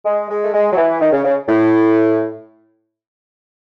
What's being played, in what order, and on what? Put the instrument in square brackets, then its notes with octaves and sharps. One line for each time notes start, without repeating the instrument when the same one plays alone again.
[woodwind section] G#3
G#3
A3
G#3
F#3
E3
D#3
C#3
C#3
A2